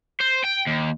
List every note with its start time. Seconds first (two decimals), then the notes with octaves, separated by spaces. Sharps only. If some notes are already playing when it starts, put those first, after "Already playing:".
0.21 C5
0.45 G5
0.67 D#2